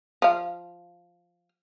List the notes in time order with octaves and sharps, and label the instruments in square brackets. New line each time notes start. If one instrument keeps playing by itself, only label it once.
[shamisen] F3 F5